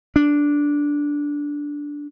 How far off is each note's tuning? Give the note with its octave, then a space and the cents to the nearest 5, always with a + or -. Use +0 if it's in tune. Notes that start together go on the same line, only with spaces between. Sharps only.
D4 -10